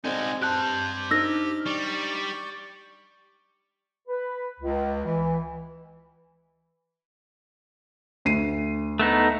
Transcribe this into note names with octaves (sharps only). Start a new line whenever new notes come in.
G#3 C4 D#4 F#4 D5 G#5
G4 C5 A5 F#6
D4 D#4 C5 E6 F6 A#6
G3 D5 C#6
B4
C#2
E3
D2 C7 D#7
A3 B3 D#4